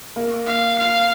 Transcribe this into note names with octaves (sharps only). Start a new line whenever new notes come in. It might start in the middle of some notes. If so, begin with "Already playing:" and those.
A#3
F5
F5